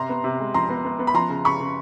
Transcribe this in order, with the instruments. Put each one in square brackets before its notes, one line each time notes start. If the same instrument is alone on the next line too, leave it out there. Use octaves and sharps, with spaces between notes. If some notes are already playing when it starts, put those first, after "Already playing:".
Already playing: [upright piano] C3 A#5 C6
B3
C3
G#3
F3 A#5 C6
B3
B3
B3
B5
F3 A#5 C6
C#3
C#3 B5 C#6
C#3